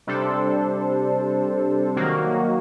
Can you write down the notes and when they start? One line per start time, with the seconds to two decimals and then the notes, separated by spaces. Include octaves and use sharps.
0.07 C3 G3 D4 A4 C5
1.97 D#3 F#3 A#3 F#4